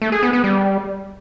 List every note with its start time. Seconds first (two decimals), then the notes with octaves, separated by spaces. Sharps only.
0.02 A3
0.12 G#4
0.23 B3
0.33 B3
0.44 G3